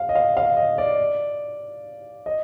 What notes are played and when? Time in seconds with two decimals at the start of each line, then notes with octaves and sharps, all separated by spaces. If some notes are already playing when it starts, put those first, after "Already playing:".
Already playing: F5
0.09 D#5
0.15 F5
0.37 F5
0.57 D#5
0.78 D5
2.26 D#5